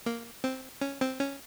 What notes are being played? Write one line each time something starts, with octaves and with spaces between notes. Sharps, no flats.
A#3
C4
C#4
C4
C#4